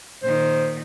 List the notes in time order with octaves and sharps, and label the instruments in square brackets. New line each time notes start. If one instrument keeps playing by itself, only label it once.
[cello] A#2 D#3 [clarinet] C5